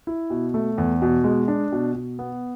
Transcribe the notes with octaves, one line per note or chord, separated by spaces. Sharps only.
E4
B2
A3
E2
B2
G#3
D4
B2
B2
B3